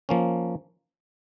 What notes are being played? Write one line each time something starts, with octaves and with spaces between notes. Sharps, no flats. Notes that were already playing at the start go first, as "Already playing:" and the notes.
F3 A#3 C#4